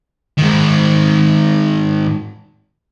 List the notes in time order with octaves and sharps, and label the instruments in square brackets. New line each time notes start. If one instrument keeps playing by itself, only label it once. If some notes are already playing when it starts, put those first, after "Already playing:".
[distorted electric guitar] G#2 D#3